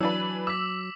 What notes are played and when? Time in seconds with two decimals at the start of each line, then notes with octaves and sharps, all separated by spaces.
0.01 E3 F#3 D4 B4 E6
0.47 D6 E6 B6